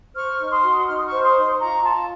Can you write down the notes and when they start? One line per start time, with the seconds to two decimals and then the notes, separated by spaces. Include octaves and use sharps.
0.15 C5 C#6 F6
0.40 D#4
0.51 C6 D#6
0.63 F#4
0.87 D#4 F6
0.97 D#6
1.06 C#6 F6
1.11 C5
1.23 C6 D#6
1.36 D#4
1.59 F4 A#5 C#6
1.84 F4 A5 C6